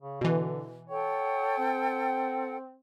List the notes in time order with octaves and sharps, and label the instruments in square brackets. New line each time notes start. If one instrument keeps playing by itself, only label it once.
[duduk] C#3
[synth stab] B2 E3 [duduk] D3
[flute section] A4 F#5 G5 [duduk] C#5
[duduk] C4